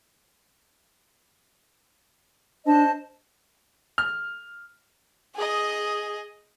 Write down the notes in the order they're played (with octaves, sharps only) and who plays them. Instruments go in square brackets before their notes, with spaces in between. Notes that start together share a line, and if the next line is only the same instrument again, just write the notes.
[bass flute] D4 [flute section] C5 D#5 A5
[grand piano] F6
[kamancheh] G#4 D#5